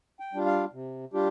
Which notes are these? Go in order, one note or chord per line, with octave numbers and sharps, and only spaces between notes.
G5
G3 D4 F4
F5
C3
G3 D4 F4 G4